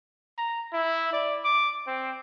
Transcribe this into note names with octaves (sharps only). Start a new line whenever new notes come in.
A#5
E4
D5
D6
C4